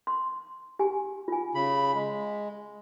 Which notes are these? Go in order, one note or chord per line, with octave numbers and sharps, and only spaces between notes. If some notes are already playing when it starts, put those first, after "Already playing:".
C6
G4 G#5
F4 G#5
C#3 B5
G#3